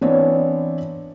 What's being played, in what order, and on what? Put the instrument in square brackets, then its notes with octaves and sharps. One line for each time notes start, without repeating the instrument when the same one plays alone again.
[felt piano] E3 B3 C4 D4 E4 C#5